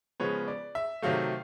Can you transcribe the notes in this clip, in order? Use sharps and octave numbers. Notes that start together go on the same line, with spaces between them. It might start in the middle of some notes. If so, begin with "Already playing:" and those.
C#3 F3 G#3 B3 C#5
D5
E5
C3 D#3 F#3 A3 F5